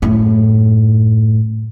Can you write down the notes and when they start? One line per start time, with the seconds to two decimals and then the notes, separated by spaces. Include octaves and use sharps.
0.02 F#2 A2